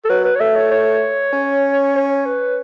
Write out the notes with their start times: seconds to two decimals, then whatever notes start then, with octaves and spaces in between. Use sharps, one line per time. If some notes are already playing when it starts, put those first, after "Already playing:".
0.05 A4
0.09 F#3 B4
0.25 B4
0.36 C#5
0.40 A3 E5
0.56 C#5
0.71 C#5
1.33 C#4
1.96 C#5
2.26 B4